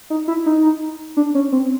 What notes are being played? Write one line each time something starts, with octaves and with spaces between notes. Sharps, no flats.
D#4
E4
D#4
D4
C#4
C4